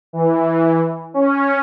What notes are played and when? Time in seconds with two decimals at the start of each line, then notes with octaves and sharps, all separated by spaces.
0.13 E3
1.14 C#4